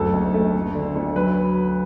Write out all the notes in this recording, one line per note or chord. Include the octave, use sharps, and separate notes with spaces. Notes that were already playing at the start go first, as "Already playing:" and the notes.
Already playing: F#1 D2 A4
D2
A3
D2
D3
D2
F#3 B4